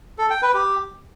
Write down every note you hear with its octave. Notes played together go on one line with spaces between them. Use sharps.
A4
G5
B4
G4